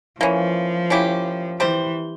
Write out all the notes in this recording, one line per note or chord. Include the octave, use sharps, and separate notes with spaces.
E3 F3 A#3 C#4
A#3 C#4 E4 G4
E3 G3 C4 G4 C5